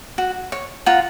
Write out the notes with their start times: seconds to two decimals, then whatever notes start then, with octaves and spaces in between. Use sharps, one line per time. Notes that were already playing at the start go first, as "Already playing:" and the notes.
0.18 F#4
0.52 C#5
0.86 F4 F#5 A#5